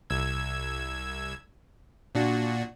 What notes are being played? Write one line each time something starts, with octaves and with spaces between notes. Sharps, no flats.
C2 E6 G#6
A#2 D4 F#4